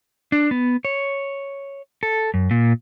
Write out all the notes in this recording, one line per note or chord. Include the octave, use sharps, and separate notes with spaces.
D4
B3
C#5
A4
F#2
A#2